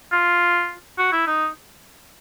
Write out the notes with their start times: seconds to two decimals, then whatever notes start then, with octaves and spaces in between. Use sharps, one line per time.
0.12 F4
0.98 F#4
1.12 E4
1.27 D#4